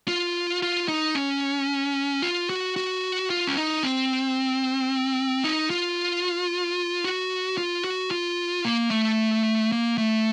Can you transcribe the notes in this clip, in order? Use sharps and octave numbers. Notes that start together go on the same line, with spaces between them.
F4
F4
D#4
C#4
F4
F#4
F#4
F4
C#4
D#4
C4
D#4
F4
F#4
F4
F#4
F4
A#3
A3
A#3
A3